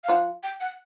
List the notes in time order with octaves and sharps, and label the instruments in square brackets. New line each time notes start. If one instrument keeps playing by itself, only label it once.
[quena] F5
[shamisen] F3 F4 [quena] F#5
[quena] G5
F#5